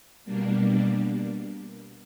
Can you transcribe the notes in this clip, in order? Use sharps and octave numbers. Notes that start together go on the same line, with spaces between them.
B2 G3 A#3 D4